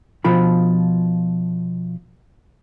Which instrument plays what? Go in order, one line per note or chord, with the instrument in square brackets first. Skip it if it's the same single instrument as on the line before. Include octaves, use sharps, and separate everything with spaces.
[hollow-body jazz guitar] B2 F3 F4 B5